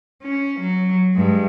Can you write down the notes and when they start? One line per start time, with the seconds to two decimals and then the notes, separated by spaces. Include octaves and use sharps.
0.22 C#4
0.60 F#3
1.14 G2 G#3